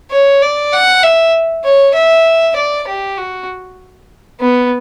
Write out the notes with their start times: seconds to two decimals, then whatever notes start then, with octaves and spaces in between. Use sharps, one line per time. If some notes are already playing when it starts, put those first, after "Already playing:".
0.11 C#5
0.42 D5
0.73 F#5
1.03 E5
1.65 C#5
1.95 E5
2.56 D5
2.87 G4
3.18 F#4
4.41 B3